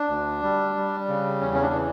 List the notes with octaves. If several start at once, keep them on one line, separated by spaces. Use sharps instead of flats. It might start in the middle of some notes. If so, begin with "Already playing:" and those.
Already playing: D4
D2
G3
G3
C#3
E2 C#4
C#4
D4
E3